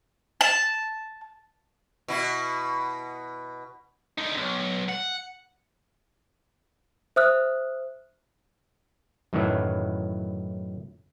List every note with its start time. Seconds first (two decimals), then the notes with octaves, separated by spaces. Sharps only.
0.41 A5
2.08 B2 E4
4.18 D3 D#4
4.37 B1
4.89 F#5
7.16 C5 E5 D#6 F6 F#6
9.33 F#2 A2 D#3 E3 F#3